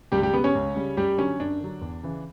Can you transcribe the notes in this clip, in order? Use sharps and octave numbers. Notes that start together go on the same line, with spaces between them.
C#2 G3 G4
G3 G4
C#3 G3 B3 B4
C#4 C#5
C#2
C#3 G3
F#2 G3 G4
D3 F#3 C#4
F#2 D4
D3 F#3
E2
C#3 E3